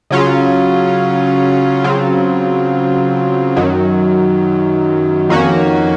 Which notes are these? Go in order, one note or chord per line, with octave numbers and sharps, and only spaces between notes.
C#3 F#3 C#4 F4
C#3 F#3 C4 F4
F#2 D#3 F#3
F2 D#3 A#3 C#4 F#4